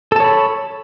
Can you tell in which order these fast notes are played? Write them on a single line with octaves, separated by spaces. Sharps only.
A4 A5 C#5 B5